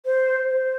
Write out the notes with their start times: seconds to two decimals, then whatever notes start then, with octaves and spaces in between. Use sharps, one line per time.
0.06 C5
0.49 C5